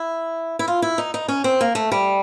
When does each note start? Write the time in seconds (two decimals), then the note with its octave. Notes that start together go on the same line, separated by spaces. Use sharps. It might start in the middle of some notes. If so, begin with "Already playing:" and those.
Already playing: E4
0.59 E4
0.68 F4
0.82 E4
0.98 D#4
1.14 D#4
1.28 C#4
1.44 C4
1.61 A#3
1.75 A3
1.92 G3